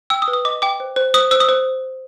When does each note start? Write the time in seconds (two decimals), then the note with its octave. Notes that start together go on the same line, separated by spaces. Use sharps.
0.10 G5 E6
0.22 D#6
0.28 B4
0.33 D#6
0.45 D#5 D6
0.62 G5 D6
0.80 C5
0.96 C5
1.14 C5 D#6
1.31 C5 E6
1.40 D#6
1.49 C5